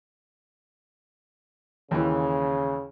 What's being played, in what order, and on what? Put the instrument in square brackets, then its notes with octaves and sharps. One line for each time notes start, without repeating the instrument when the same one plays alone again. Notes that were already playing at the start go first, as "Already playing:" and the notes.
[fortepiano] D#2 E3 [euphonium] C#3